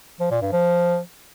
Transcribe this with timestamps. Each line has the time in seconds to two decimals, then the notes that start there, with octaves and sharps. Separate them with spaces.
0.20 F3
0.31 A#2
0.42 G2
0.53 F3